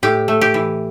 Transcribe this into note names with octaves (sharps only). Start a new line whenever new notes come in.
A2 G4
A3
G4
E3